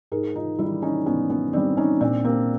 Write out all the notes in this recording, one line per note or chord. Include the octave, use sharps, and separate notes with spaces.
G#2 G#4 A#4
D#4 F4
D#3 G3 D4 E4
C#4 D#4
G#2 B3 C#4
B3 C#4
D#3 G3 C4 D4
C#4 D#4
A#2 C4 D4
A#3 C4